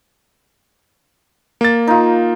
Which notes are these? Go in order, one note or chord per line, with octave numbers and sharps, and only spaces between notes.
A#3 A6
D#4 F4